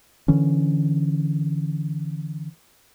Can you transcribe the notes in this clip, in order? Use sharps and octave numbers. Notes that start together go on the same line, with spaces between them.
D3 E3 C#4